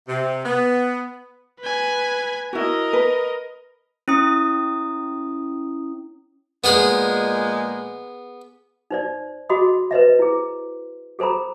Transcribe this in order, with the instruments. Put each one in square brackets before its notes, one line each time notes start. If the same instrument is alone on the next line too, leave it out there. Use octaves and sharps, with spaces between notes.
[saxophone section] C3
B3
[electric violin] B4 G#5
[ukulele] E4 F#4 [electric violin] A#4 D#5
[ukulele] B4
[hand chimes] C#4 E4 D#6
[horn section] A#2 F3 G#3 [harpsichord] B3 G#4 B5
[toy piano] D#4 C5 D5
F#4 G#4 D#5 B5 D#6
B4 C5 D#5 E5
E4 G#4
G#4 A4 C5 A#5 B5